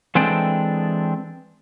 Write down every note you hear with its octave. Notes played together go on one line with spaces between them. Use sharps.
E3 G#3 C4 D4 A4 G5